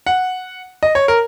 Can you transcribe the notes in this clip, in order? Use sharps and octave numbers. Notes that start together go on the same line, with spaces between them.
F#5
D#5
C#5
A#4